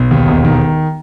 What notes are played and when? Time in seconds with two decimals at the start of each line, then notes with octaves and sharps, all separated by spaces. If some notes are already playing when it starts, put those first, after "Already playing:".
Already playing: B1
0.11 D#2
0.28 E1
0.45 D#3